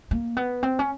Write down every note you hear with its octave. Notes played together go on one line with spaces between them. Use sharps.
A#3
B3
C4
C#4